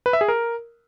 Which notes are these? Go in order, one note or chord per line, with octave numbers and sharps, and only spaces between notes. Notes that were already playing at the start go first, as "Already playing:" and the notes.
B4
E5
G#4
A#4